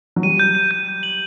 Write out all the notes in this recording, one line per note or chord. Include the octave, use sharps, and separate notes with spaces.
F#3
G3 D#7
G6
D#7
G6
D#7
F#7